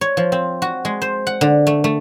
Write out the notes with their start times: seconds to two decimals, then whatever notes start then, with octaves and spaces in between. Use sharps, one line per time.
0.01 C#5
0.17 F3
0.32 C4
0.62 F#4
0.85 G#3
1.02 C5
1.27 F#5
1.41 D3
1.67 A3
1.84 A3